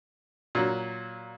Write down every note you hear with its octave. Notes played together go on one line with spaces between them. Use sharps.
A#2 F#3